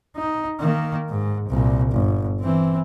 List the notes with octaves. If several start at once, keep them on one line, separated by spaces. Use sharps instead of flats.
D#4
D#3 A#3
G#2
C2 A#2
G1
E3 C4